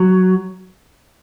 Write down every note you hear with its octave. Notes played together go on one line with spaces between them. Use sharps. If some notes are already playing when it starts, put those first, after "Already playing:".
Already playing: F#3